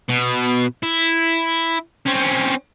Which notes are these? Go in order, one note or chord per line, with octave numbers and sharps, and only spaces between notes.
B2
E4
C4 C#4